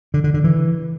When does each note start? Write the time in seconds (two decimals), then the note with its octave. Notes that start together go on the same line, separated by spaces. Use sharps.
0.14 D3
0.24 D3
0.34 D3
0.44 E3